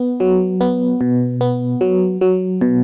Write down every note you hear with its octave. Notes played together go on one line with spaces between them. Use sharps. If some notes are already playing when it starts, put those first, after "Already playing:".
Already playing: B3
F#3
B3
B2
B3
F#3
F#3
B2